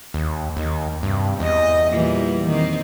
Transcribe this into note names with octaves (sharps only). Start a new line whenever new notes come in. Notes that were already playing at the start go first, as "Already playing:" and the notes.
D#2
D#2 D#3
G2 C3
E2 D#5
A#2 E3 G3
D#3 C4